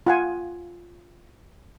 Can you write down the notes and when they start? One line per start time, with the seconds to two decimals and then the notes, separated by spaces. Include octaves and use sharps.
0.07 F4 F#5 G#5